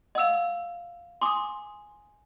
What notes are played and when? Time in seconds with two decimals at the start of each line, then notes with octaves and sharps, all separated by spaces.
0.15 D#5 F5 F#5 E6
1.21 G#5 C6 D6 D#6